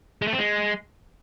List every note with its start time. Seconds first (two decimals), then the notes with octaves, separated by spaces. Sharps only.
0.22 G#3
0.27 A3
0.33 C4
0.38 G#3